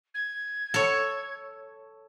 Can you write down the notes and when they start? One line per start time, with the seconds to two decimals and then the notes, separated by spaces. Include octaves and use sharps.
0.14 G#6
0.74 A4 C#5